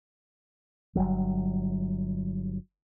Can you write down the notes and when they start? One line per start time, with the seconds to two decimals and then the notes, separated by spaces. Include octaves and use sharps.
0.95 G1 C#2 F#3 G3